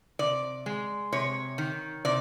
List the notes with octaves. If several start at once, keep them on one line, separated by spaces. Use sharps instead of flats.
C3 D5
G#3
C3 C#5
D#3
C3 D5